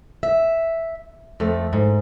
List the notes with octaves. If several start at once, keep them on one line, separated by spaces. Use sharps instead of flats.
E5
F2 A3
G#2